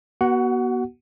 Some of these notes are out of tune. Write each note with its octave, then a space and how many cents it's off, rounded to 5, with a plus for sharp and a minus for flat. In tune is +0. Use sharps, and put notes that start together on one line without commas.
B3 -35 F#4 +25 F#5 +0